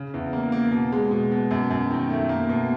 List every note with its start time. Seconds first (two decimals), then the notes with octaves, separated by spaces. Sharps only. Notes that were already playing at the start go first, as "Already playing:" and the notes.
Already playing: C#3
0.14 E2
0.33 A#3
0.52 A#3
0.72 B2
0.92 G#3
1.11 B2
1.31 B2
1.51 F#2
1.71 F#2
1.91 D#3
2.10 A3
2.29 A#3
2.49 B2